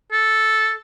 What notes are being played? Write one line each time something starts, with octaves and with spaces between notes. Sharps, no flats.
A4